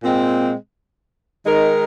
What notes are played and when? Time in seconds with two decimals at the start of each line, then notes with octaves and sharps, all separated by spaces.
0.03 A#2 G#3 C4
1.46 D#3 G#3 D#4 A#4